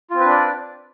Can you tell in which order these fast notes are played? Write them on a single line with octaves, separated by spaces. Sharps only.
F4 C4 B4 D4 D5